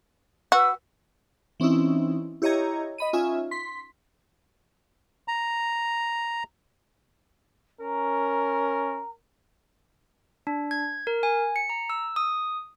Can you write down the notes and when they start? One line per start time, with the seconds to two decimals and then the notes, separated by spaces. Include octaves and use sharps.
0.52 F#4 B4 E6
1.60 E3 C4 C#4 D#4 E4
2.42 E4 G4 C#5 D#5 A#5 G#6
2.98 D#5 B5 D#7
3.13 C#4 D#4 F4 E5 G#5
3.51 C6 B6
5.28 A#5
7.81 C#4 A#4 A#5
10.47 D4
10.71 G#6
11.07 A#4
11.23 G#5
11.56 C#7
11.70 A#5
11.90 E6
12.16 D#6